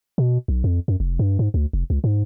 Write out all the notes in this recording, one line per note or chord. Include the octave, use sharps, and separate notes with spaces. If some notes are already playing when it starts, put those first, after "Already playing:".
B2
B1
F2
F#2
F1
G2
G#2
D2
F1
C#2
G#2